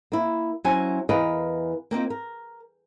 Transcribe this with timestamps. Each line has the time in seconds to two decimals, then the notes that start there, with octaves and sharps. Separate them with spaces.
0.12 A#3 E4
0.64 F#3 C#4 E4 C5 G#5
1.09 E2 E3 A#4 B4 D#5 F5
1.91 A#3 C4 D#4 F4
2.10 A#4